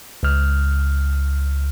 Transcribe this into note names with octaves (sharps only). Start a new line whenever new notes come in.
C#2 F6